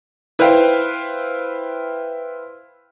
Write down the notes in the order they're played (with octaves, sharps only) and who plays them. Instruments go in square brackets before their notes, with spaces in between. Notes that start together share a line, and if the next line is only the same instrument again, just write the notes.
[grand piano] E4 B4 C5 F5 G5